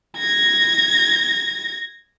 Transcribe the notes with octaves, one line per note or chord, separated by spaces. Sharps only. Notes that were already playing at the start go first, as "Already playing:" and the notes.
G#6 A#6